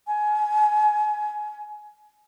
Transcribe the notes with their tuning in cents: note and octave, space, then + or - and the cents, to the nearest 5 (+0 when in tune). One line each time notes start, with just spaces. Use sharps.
G#5 +25